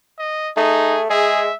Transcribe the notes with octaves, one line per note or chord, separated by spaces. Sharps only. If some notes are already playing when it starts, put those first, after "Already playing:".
D#5
A3 D#4 G#4
G#3 G#4 E5